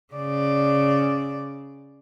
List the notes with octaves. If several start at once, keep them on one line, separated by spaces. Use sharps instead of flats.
C#3 D5